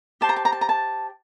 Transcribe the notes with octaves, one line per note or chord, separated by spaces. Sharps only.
G4 C5 A5
A#5
A5
A#5
A5
A#5
A5